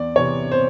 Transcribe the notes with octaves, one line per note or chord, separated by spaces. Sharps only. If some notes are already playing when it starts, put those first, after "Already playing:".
Already playing: E2 D5
C3 E3 C#5
C5